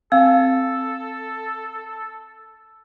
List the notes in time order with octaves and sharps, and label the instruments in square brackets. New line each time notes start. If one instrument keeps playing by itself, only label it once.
[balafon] C4 [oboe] A4 [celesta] F5 [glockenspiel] E6